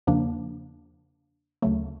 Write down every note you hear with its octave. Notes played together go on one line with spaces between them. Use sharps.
E2 C#3 F3 A#3 D4
D2 C#3 F#3 A3